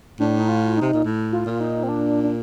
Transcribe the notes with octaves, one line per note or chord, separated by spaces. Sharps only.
A2 D4
D#4
F4
C3 D#4
A#2
A2
F4
A#2
D#4
C4
D4
D4